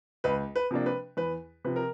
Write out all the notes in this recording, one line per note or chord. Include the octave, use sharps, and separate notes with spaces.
C#2 B4
B4
C3 F3 A#3 D4
B4
E2 B4
C3 F3 B4
A#4